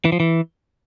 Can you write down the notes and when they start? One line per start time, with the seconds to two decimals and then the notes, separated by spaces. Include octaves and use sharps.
0.05 E3
0.12 F3
0.20 E3